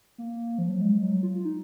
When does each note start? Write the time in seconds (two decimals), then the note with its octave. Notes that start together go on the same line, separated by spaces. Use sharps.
0.18 A#3
0.58 F3
0.69 F#3
0.81 G#3
1.03 F#3
1.23 F4
1.45 D#4